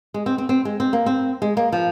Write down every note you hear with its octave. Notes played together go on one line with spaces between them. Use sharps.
G#3
C4
C4
C4
G#3
C4
A#3
C4
G#3
A#3
F3